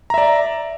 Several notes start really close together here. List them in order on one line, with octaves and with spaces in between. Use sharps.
A#5 E5 D5